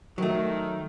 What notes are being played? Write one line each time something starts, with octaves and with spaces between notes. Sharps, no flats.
D#3 F#3 A3